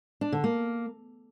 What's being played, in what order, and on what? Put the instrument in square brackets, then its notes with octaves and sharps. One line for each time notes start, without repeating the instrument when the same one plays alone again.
[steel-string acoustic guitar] D4
D3
A#3